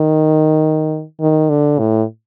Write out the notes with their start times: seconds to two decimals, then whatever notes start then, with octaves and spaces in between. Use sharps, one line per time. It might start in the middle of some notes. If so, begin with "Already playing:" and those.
Already playing: D#3
1.21 D#3
1.50 D3
1.79 A2